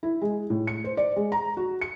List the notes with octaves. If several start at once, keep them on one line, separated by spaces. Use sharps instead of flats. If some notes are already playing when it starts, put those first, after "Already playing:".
E4
G#3
A2
C#7
C5
D5
G#3
A#5
F#4
C#7